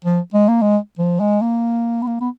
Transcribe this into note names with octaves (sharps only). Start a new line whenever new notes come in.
F3
G#3
A#3
G#3
F3
G#3
A#3
B3
A#3
B3